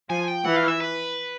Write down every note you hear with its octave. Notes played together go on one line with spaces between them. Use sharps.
F3 G#5
G5
E3 F#5
F5
E5
B4